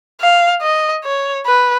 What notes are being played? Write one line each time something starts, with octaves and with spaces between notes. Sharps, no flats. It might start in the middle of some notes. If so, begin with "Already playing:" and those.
F5
D#5
C#5
B4